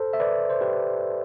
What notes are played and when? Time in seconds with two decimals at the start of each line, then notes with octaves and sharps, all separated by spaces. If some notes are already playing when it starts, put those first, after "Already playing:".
Already playing: A4 C5
0.13 E5
0.20 B4 D5
0.50 C5
0.61 G4 B4